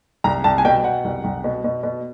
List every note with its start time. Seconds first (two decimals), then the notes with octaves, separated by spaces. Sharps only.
0.24 C2 A#5
0.44 C2 A5
0.58 G#5
0.65 B2 G5
0.84 B2 F#5
1.04 C2
1.24 C2
1.44 B2
1.64 B2
1.83 B2